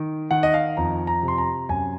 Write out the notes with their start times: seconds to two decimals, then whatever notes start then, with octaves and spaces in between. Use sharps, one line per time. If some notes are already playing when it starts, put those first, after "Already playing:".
Already playing: D#3
0.31 D#3 F#5
0.43 D#5
0.54 F5
0.77 F2 A#5
1.07 A#5
1.23 C3
1.28 C6
1.38 A#5
1.69 F#2 G#5